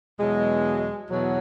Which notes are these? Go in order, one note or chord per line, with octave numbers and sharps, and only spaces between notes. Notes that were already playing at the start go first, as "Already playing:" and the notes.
E2 B2 F#3 G#3
E2 B2 F#3